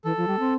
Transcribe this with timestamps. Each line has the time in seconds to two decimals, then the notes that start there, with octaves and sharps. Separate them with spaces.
0.04 E3 A4
0.17 F3
0.27 G3
0.39 C4